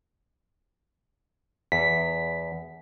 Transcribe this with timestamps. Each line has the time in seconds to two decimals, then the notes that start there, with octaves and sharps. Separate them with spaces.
1.72 E2 B6